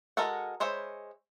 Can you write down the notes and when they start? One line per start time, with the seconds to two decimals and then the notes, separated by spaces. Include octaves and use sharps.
0.17 G#3 F#4 A4 A#4 F#5
0.60 G#3 C5 C#5 E5 B5